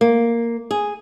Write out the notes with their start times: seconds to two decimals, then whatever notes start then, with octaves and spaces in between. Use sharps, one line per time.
0.01 A#3
0.71 G#4